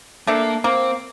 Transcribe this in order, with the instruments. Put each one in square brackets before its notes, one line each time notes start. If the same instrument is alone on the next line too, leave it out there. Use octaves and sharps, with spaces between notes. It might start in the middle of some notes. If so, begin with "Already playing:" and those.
[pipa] A3 D4 A4 [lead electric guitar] A#3
[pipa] A#3 [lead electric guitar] C4